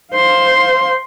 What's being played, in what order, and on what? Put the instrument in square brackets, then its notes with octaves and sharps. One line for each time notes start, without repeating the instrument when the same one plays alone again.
[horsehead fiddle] C5 F5 [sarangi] C6